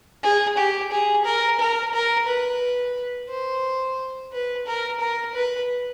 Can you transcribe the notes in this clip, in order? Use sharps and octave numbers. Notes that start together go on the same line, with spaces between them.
G#4
G4
G#4
A#4
A#4
A#4
B4
C5
B4
A#4
A#4
B4